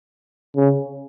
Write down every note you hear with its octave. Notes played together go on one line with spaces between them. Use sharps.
C#3